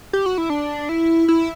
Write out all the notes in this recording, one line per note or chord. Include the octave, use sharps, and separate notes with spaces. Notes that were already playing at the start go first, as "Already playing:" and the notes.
G4
F#4
E4
D4
E4
E4